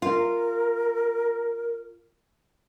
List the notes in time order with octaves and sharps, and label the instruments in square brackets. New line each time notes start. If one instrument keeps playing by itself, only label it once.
[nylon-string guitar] F4 [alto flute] A#4